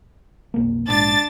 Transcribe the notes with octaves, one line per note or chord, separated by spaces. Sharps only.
F1 B1 A#3
A#1 G#2 D4 A6